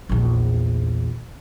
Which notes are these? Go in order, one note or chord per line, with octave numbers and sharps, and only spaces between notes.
A#1 E2